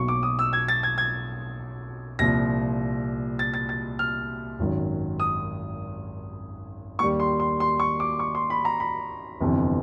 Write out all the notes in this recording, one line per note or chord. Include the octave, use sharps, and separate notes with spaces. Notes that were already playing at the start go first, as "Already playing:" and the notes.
Already playing: B1 B2 F#3 A#3 C#6
D6
D#6
E6
G#6
A6
G#6
G#6
C2 A#2 F3 A#6
A6
A6
A6
F6
G#1 F#2 D#3 F#3
D#6
D#2 D#3 G3 C#6
C6
C6
C6
C#6
D6
C#6
C6
B5
A#5
B5
G1 F2 C3 E3